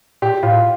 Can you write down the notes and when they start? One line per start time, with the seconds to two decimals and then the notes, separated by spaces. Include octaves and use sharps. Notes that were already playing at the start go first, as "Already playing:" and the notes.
0.22 A#2 G4
0.43 A2 F4